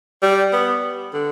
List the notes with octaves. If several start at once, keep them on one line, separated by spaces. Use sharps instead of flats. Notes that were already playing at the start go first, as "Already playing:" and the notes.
G3
B3
D3